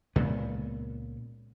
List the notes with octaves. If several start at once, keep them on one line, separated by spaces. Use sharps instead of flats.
C#2 A#2 B3